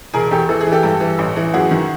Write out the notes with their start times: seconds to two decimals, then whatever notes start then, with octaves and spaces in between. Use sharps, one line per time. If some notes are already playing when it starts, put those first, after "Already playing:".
0.13 E1 G#4 A#4
0.31 E2 G4 A4
0.49 E3 A4
0.61 G#4
0.66 E3
0.72 G4 A4
0.83 G2
1.00 E3
1.19 A1
1.36 E3
1.54 F#2 F#4 G#4
1.71 D#3